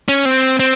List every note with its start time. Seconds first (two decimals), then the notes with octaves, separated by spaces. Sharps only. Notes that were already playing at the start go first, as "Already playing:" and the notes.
0.09 C#4
0.25 C4
0.59 C4